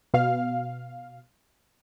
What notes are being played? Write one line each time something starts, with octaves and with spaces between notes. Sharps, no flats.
B2 F5